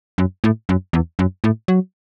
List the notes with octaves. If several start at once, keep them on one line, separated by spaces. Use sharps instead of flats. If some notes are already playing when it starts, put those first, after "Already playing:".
F#2
A2
F#2
E2
F#2
A2
F#3